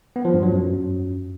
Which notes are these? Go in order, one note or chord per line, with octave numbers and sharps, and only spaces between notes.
B3
F3
G2
F#3
F#2